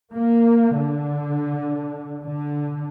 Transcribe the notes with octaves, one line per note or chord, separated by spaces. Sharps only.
A#3
D3
D3